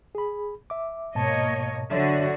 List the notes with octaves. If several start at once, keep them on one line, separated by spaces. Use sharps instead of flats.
G#4 B5
E5 D6
G#2 B2 A#3 C#5 D#5 A5
D3 F#3 F#4 C#5 E5